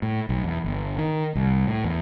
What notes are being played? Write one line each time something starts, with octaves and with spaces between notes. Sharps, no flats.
A2
B1
E2
G1
D#3
C2
A2
E2